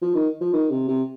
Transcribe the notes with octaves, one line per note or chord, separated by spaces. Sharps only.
F3
D#3
F3
D#3
C3
C3